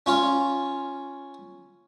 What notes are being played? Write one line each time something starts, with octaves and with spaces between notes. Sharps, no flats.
C#4 F4 C#5